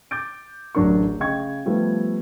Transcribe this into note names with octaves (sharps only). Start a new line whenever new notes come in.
D6 G6 A6 D7
D1 A1 F#3 D4 A#4 C#6
C#3 D#5 G5 C#6 G#6
F3 G3 A3 B3